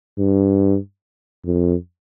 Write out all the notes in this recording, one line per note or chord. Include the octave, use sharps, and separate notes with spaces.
G2
F2